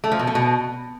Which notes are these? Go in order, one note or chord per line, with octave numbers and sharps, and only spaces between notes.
A3
F3
B2
A3
B2